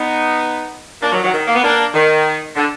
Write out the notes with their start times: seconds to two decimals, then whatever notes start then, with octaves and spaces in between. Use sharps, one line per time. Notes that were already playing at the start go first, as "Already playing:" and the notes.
Already playing: B3 D#4
1.02 A#3 D4
1.12 D#3 F#3
1.23 D#3 F#3
1.33 D#3
1.47 A#3
1.55 B3
1.63 A#3 D4
1.94 D#3
2.55 D3